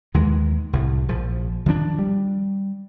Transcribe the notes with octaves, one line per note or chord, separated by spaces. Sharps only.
D#2 D#3 E3 G#3
C2 A2
A#1 F3
D#3 F3 G#3 D4
G3